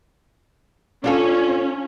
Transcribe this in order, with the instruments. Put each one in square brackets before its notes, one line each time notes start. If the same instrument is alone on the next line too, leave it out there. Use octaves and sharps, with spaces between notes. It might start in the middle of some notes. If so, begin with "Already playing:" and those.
[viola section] C#4 [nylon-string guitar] D4 F4 A4